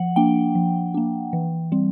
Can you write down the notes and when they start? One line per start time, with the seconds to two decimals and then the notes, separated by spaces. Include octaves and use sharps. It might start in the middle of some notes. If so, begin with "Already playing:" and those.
Already playing: F3 F#5
0.16 A#3 D4 G5
0.55 F3
0.94 A#3 D4
1.33 E3
1.72 G3 C4